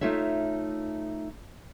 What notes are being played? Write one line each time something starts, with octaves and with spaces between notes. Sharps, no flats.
A3 D#4 F4 C#5 E5